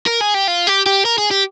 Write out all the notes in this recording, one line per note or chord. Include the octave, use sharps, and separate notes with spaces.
A#4
G#4
G4
F4
G4
G4
A#4
G#4
G4